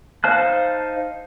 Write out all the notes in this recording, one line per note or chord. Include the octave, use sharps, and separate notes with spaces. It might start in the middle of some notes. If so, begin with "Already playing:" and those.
D#4 C5 F5 A5 F#6